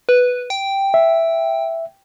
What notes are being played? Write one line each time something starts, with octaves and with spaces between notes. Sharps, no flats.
B4
G5
E5